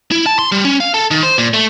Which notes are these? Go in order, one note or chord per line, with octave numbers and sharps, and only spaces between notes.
E4
A5
C6
G3
C#4
F5
A4
D#3
C5
A#2
A3